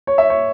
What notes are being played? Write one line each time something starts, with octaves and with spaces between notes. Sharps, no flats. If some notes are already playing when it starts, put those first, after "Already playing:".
C#5
E5
C#5